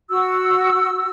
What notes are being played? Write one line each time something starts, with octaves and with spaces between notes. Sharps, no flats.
F#4 E6